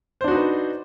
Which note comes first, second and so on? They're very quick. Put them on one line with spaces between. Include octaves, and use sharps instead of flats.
C5 D4 F#4 D#4 B4